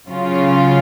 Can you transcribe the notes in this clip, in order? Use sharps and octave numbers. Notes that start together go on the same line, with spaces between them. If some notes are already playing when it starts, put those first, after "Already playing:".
C#3 F#3 C#4 F4